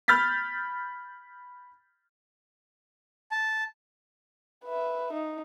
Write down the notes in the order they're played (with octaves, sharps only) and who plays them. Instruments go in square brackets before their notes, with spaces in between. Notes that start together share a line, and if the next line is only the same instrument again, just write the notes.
[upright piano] B5 F6 G6 A6 B6
[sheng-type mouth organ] A5
[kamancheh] B4 E5
D#4